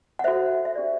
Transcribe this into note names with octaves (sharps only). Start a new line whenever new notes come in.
F#5
F#4 A4 C5 E5
E5
D4 G4 C5 D5